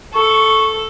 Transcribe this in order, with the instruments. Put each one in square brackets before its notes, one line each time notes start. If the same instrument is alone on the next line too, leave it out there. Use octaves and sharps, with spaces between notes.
[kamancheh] A4 [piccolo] C#6